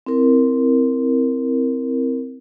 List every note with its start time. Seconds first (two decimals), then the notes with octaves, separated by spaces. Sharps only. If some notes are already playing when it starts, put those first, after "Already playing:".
0.06 C4 E4 A#4